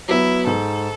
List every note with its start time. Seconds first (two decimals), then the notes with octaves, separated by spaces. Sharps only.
0.08 F#3 B3 E4
0.46 G#2 A4